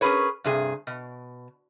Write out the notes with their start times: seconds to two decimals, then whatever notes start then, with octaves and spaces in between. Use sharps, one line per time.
0.01 C#4 G#4 A#4 B4 C#5
0.44 G2 C3 G#4
0.87 B2